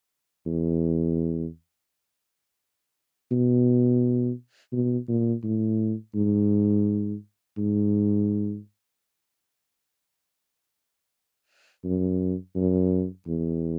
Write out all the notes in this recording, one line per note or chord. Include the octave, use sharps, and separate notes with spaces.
E2
B2
B2
A#2
A2
G#2
G#2
F#2
F#2
E2